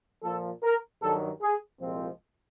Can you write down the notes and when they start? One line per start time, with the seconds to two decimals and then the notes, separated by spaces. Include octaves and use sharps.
0.23 A#2 F3 A#3 A4
0.63 A#4
1.02 G2 D#3 F#3 A4
1.42 G#4
1.81 C2 A#2 F3 G#3 C4